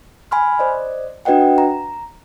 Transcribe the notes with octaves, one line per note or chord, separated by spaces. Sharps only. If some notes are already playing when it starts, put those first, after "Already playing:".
G#5 B5 C6 F6
C5 D5 D#5
D4 F#4 B4 D#5 F#5 G5
A#5